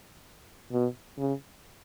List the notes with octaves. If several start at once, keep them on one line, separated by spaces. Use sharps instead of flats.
B2
C#3